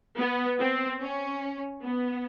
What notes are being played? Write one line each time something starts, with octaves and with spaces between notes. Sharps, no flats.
B3
C4
C#4
B3